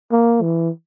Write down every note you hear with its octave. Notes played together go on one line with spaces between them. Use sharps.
A#3
E3